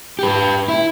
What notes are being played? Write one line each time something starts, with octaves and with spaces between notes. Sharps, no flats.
G4 B4
E4